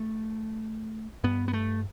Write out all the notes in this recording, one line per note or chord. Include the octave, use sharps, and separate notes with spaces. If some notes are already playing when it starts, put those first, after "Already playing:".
Already playing: A3
G2 B3
B3
A3